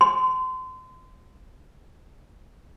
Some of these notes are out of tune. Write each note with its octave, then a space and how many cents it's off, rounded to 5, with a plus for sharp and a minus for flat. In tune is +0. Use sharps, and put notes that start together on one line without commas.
C6 -30